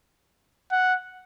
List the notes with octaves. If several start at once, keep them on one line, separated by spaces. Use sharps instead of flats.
F#5